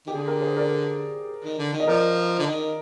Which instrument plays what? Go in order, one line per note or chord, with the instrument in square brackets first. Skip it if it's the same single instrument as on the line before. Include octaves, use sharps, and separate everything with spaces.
[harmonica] D#3 [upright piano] G4
[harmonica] D3 [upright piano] G#4
[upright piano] G4 A#4
G#4 C5
A#4 D5
[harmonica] D#3
D3
D#3
[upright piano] D#5
[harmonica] F3 [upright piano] A#4 D5
[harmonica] D3
D#3